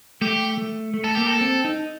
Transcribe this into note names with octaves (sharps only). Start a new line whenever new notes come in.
A3 G4
A3
A3
A4
A#3 G4
A4
C4
D#4